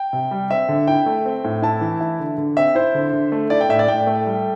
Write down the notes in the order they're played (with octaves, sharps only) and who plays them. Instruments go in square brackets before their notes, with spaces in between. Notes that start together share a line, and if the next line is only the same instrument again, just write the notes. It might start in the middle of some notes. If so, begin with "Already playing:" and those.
Already playing: [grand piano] G5
C3
G3
C4 E5
D3
E4 G5
A3
C4
A2
E4 A5
E3
E4
D3
D3
C4 E5
E4 C5
D3
D3
A3
E4 D5
G5
A2 E5
D5
A2 G5
A3
G3